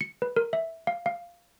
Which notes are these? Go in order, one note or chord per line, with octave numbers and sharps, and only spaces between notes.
C#7
B4
A#4
E5
F5
F5